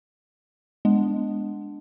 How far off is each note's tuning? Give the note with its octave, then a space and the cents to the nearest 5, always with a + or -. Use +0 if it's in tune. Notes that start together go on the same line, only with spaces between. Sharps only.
G#3 +0 B3 +0 D4 +0